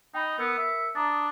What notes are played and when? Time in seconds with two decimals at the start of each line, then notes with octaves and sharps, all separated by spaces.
0.14 D#4 G5 B5
0.39 B3 A#4 E6 C#7
0.58 E5
0.95 D4 A#5 D#6 A6